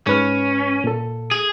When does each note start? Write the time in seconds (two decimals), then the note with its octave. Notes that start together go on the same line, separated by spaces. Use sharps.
0.07 G#2 C#4 B4 F6
0.84 A#2 A4
1.31 G#4